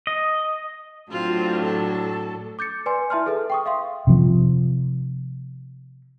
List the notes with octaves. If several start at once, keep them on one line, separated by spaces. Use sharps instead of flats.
D#5
A2 F#3 C4 D4 F4
A4
D6 G6 A6 C#7
B4 D5 G#5 C6
E4 E5 A5 C6 F6
G#4 A4 B4 E5
G5 C#6 D#6
E5 F5 C6
C3 F3